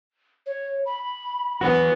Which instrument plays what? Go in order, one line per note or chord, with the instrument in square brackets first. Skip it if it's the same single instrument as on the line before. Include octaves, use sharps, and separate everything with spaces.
[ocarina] C#5
B5
[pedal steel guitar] E3 F#3 F#4 [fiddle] B3